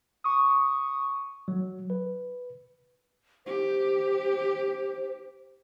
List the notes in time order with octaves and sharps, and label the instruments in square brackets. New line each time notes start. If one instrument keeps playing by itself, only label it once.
[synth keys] C#6 D#6
[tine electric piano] F#3
B4
[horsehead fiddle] G4 [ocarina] C5